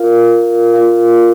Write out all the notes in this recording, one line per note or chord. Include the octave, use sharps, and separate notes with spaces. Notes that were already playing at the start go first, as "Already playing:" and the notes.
Already playing: F4 A#4 F5
F4 A#4 F5